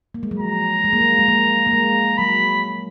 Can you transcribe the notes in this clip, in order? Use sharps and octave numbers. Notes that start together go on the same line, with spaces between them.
A#3
G#3
F#3
F3 A#5
G#3
A#3
G#3
G#3
A#3
A#3
G#3
F#3 B5